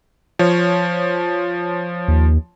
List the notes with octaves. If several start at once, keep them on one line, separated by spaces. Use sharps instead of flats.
F3 C#5
D#2